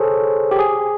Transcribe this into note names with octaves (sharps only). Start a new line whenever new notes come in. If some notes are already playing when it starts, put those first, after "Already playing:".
Already playing: G#4 A4 C5 C#5
G4
G#4